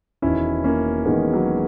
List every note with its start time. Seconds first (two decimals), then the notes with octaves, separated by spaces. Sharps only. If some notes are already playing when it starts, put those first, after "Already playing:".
0.22 E1 E2 D#3 C#4 E4
0.64 A#3 C#4
1.05 E1 E2 D#3 G#3 B3
1.33 F#3 A#3